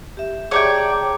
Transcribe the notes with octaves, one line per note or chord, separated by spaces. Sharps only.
G4 E5
G#4 C#5 D5 G5 A5 A#5